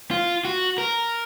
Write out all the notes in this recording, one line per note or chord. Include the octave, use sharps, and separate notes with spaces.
F4
F#4
A#4